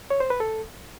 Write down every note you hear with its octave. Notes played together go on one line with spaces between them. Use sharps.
C#5
C5
B4
A4